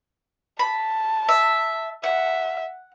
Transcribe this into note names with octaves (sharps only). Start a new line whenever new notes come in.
A5 B5
E5
E5 F#5